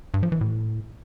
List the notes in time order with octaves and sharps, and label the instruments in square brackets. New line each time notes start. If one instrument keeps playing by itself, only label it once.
[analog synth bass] G2
F3
E3
A2